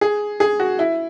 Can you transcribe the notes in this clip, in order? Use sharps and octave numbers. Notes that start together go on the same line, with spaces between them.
G#4
G#4
F#4
E4